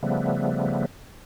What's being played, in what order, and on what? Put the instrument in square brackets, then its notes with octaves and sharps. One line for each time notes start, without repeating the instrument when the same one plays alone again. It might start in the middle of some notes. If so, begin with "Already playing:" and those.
[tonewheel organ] C#3 F3 G3 A3 B3